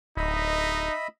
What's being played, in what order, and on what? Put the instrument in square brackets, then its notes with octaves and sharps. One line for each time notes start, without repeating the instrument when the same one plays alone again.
[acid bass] D1 [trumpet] D#4 [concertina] D#5 E5 B5